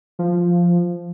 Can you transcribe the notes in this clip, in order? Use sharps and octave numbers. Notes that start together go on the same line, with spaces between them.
F3